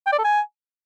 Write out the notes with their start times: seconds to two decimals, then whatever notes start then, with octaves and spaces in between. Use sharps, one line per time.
0.06 G5
0.13 D5
0.19 A4
0.25 G#5